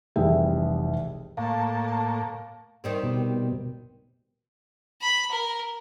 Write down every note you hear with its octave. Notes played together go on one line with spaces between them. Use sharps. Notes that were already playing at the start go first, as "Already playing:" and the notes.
F1 C2 E3 G#4 E5 G5
A2 A#3 F5 A5
D#3 G3 C4
B2
B5
A#4